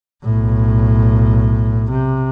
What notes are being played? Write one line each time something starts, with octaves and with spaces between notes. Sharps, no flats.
B1 A2
C3